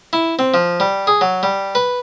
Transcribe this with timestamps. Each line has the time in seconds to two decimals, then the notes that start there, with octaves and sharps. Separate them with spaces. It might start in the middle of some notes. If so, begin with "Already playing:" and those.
0.13 E4
0.39 C4
0.54 F3
0.80 G3
1.07 G#4
1.21 F#3
1.43 G3
1.75 B4